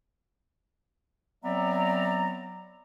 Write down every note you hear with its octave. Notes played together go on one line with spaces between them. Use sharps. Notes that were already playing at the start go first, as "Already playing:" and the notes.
F#3 B3 C4 D5 E5 A#5